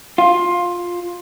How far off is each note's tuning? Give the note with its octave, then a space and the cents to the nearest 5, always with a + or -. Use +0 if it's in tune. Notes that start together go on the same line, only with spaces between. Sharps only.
F4 +10